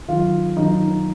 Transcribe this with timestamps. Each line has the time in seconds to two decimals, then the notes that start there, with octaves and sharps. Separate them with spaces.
0.08 F#2 D#3 F4
0.57 F#2 D#3 D#4